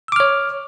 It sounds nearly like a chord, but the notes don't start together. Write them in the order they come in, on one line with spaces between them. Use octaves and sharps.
E6 D6 F6 C#5